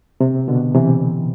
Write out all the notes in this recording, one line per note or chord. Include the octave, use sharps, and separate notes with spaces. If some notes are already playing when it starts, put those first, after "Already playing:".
C3
B2 D3
C3 E3